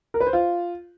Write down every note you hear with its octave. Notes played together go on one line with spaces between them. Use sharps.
A#4
B4
C5
F4